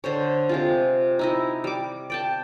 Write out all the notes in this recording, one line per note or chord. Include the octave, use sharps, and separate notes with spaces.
D3 C5 C#5
C3 G#3 F4
D#4 E4 D#5
G3 D6
D5 G5 A5